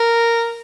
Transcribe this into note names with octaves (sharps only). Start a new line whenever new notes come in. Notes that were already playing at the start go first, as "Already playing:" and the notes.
Already playing: A#4